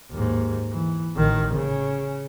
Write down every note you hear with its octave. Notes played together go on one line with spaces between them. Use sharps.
D#2 G#2
E3
A1 D#3
C#3